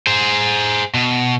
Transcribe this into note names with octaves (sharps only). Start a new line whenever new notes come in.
G#4 C5
B2